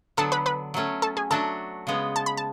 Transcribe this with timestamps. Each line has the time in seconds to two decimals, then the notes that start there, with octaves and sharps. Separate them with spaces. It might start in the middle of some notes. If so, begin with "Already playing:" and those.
0.17 D3 F#3 B3 A4 A5
0.32 B4 B5
0.46 B4 B5
0.74 F#3 A3 C#4
1.02 A4 A5
1.17 G#4 G#5
1.31 F#3 A3 D4 F#4 A4 A5
1.87 C#3 G#3 B3
2.16 A5
2.26 B5
2.37 A5